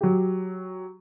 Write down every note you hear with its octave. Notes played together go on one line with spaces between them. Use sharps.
F#3 G4